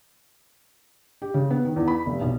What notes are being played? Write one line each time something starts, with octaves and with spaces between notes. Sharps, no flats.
G4
C#3
B3
D#3
E2
B5
F1
B1